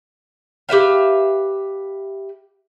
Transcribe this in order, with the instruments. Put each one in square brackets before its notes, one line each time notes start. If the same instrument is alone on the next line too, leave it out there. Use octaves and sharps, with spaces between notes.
[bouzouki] G4 B4 E5 F5